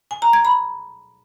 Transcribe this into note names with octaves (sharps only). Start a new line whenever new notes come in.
G#5
A#5
G#6
B5